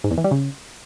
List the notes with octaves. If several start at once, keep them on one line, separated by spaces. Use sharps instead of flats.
G#2
E2
E3
G3
C#3